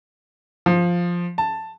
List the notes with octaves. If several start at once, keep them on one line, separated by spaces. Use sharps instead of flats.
F3
A5